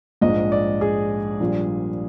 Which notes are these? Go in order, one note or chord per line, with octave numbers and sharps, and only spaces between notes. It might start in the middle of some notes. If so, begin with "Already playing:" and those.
A#1 G#2 F3 G#3 D#5
D5
G#4
A#1 A#2 G3